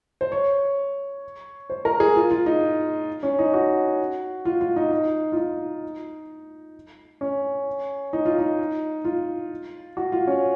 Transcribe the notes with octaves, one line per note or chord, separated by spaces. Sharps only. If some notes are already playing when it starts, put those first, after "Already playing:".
C5
C#5
C5
A#4
G#4
F4
F4
D#4
C#4
D#4
F#4
F4
F4
D#4
D#4
F4
D#4
C#4
D#4
F4
D#4
F4
F#4
F4
C#4